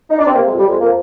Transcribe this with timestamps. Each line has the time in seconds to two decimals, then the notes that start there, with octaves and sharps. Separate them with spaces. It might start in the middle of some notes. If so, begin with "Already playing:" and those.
0.10 D#4
0.19 D4
0.27 C4
0.35 C3 A#3
0.47 G#3
0.51 F2
0.58 G3
0.66 F2 G#3
0.80 F3 A#3